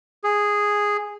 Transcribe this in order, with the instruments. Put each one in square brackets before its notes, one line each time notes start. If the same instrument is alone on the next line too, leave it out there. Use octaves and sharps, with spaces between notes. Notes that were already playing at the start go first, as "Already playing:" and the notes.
[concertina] G#4